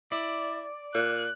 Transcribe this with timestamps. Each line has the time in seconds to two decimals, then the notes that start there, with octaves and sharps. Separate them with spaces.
0.12 E4 D5
0.94 A#2 F#6